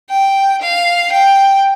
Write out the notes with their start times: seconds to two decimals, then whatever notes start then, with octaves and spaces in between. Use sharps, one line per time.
0.10 G5
0.62 F5
1.12 G5